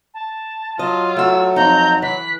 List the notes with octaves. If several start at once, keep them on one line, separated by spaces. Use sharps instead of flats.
A5
F#3 F4 D#5
A3 F#4 E6
F2 D#4 A#5 G6
E3 F#6 B6